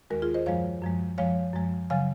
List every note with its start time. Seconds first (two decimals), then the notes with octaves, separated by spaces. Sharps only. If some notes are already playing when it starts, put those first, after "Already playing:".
0.10 D#2 D#3 G#3 F#4 A#4
0.22 F4 G#4
0.34 C5 D#5
0.46 F#2 F3 G#3 C#5 F5
0.82 F#2 F3 G#3
1.18 F#2 F3 G#3 C#5 F5
1.54 F#2 F3 G#3
1.90 C#3 F#3 F5 G#5